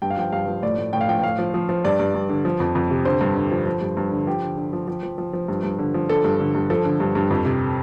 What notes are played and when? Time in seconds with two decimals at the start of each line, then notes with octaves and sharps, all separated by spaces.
0.02 G2 G5
0.10 F5
0.17 F3 G5
0.32 G2 F5
0.48 F3
0.63 A2 D5
0.78 A2
0.93 A2 G5
1.01 F5
1.08 F3 G5
1.19 G5
1.23 A2 F5
1.38 F3
1.54 F3
1.69 F3
1.84 G2 D5
2.00 G2
2.14 G2
2.29 D3
2.45 F3
2.60 F2
2.75 F2
2.91 C3
3.05 D3 C5
3.21 G2
3.36 D3
3.51 F3
3.66 F3
3.81 G2
3.97 G2
4.12 D3
4.27 F3 G4
4.42 D3
4.57 D3
4.73 F3
4.88 F3
5.03 F3
5.18 F3
5.33 F3
5.48 G2
5.63 G2
5.79 D3
5.94 F3
6.09 D3 A4
6.24 G2
6.40 D3
6.55 G2
6.70 F3 A4
6.85 D3
7.00 G2
7.15 G2
7.30 F2
7.45 C3